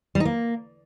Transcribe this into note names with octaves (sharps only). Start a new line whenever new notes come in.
G3
D#4
A#3